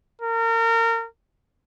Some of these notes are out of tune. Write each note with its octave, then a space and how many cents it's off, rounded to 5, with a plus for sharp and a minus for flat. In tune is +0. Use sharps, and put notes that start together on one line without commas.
A#4 -30